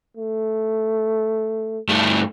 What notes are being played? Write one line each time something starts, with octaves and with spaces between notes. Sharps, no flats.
A3
G2 A3